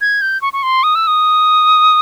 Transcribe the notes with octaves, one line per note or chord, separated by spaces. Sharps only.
G#6
G6
C#6
C#6
C6
D#6
E6
D#6